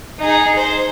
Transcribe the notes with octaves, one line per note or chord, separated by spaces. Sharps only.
D#4 G#4
C5